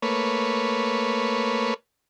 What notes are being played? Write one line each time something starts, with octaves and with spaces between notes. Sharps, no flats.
A3 A#3 B4 C#5